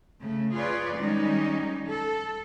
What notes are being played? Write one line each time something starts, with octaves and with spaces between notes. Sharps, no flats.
C#3 A3
F4 G#4 B4 C#5 D5
D#3 G3 G#3 C#4 D#4
A4